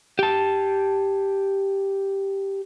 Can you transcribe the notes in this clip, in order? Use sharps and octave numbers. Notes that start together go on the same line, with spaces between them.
G4 A5